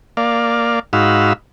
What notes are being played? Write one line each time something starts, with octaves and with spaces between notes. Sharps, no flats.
A#3 D5 F5
G#2 D#4 F#4 F5 B5 E6